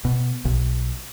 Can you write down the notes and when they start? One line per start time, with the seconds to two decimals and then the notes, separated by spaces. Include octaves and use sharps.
0.05 B2
0.45 B1